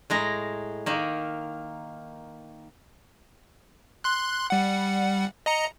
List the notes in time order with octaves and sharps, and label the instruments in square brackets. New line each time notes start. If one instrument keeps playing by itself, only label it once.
[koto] A2 G#3 A#5
D#3 A#3
[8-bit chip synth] C6 F#6
G3 F#5
D#5 A#5 C#7